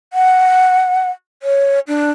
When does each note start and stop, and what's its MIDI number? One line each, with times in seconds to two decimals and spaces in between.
0.13 1.09 78
1.43 1.79 73
1.88 2.11 62